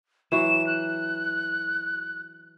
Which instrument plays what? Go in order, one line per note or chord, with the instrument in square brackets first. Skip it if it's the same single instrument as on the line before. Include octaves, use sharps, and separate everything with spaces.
[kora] E3 F#3 F#4 [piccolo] E7
[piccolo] F#6